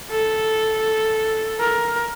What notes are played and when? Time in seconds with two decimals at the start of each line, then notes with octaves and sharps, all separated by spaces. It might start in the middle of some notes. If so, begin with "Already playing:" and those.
0.10 A4
1.60 A#4